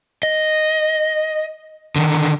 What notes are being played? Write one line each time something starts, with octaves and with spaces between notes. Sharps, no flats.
D#5
D3 D#3